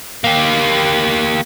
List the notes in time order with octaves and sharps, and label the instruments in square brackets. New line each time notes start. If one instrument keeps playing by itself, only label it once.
[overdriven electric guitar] A#3 G4